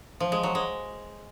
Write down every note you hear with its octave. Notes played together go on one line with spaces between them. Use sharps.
F3
G#3
F#3
G#3